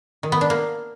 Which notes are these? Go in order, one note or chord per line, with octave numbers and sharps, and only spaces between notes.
D#3
B3
D4
A#3